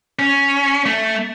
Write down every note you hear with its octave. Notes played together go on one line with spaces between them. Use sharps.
C#4
A3